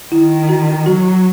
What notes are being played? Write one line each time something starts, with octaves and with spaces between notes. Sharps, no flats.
D#3 E4
F#4
F#3 F#4